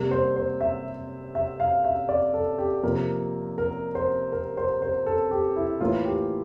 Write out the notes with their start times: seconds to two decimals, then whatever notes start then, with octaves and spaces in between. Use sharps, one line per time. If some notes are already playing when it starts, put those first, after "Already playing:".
Already playing: C3 G3 A#3
0.11 C5
0.36 C5
0.61 E5
1.35 E5
1.60 F5
1.85 E5
2.09 D5
2.34 A4
2.58 G4
2.83 C3 F3 A#3 A#4
3.58 A#4
3.95 C5
4.32 A#4
4.57 C5
4.82 C5
5.06 A4
5.31 G4
5.56 E4
5.81 A2 E3 A#3 F4
6.05 G4